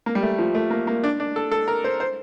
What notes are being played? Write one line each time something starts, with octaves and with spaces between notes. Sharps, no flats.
A#3
G3
A3
F3
A3
A#3
A#3
D4
D4
A4
A4
A#4
C5
C5